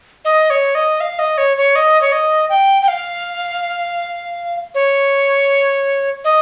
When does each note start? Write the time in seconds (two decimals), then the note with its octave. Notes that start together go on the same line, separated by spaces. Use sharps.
0.25 D#5
0.50 C#5
0.75 D#5
1.01 F5
1.19 D#5
1.38 C#5
1.57 C#5
1.76 D#5
2.02 C#5
2.12 D#5
2.50 G5
2.82 G5
2.88 F5
4.75 C#5
6.25 D#5